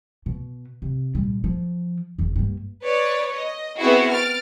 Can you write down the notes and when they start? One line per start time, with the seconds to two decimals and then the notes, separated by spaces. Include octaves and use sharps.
0.26 B2
0.82 C3
1.15 A#2 G3
1.44 F3
2.19 F#1 F2
2.36 G2 A#3
2.84 B4 C#5 D5
3.35 D#5
3.78 B3 C4 E4 F#4 G#4
4.11 F6 A6 D7